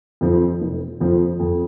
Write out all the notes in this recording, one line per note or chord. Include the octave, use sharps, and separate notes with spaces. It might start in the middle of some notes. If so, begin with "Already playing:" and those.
F2 F3 C4
F1
F2 F3 C4
F2